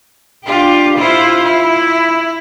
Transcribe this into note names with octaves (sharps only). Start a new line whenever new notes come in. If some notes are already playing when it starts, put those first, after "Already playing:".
D4 F4 G4
E4 F4 C5
E4